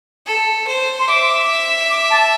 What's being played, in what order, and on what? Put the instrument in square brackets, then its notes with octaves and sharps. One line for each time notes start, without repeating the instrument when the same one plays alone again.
[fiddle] A4
C5
[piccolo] C6
[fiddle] E5 [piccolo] D6
[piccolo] D6
A5